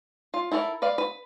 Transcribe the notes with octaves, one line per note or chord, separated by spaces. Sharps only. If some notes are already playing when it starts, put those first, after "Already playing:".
F4
E4 A4 A#4 C#5 B5
B4 D5 F5
B4